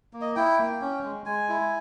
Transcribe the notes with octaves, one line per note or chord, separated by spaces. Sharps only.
A#3
D#5
E4 G5
A#3
C#4
G#3
G#3 G#5
E4